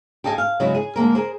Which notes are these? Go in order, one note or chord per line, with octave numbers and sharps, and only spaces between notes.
G4 A4 D#5 F5 G#5
F5
C#3 F#3 G#3 B3 E4
G#4
D3 G#3 A#3 A#4
G#4 A#4 C5